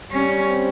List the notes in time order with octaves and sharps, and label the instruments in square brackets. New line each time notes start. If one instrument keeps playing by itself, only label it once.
[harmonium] G3 [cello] C#4
[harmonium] C4